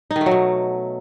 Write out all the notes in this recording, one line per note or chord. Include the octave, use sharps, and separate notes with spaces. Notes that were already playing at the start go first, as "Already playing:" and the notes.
D#4
D#3
A3
F#3
B2